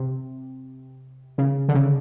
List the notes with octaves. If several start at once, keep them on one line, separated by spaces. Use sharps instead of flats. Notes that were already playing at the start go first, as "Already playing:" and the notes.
Already playing: C3
C#3
D3
C#3